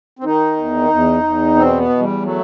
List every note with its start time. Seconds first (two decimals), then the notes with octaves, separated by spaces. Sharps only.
0.19 C4
0.24 D#3 D#4
0.56 E2
0.90 E2
1.23 E2
1.55 B2 C4
1.77 B3
1.89 E2
2.00 G3
2.22 F#3 A3